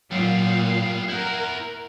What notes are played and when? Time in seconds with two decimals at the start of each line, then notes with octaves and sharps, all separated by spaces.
0.11 A#2 F#3 G3 B3 F5 D#7
1.08 E4 A#4 F#5 G6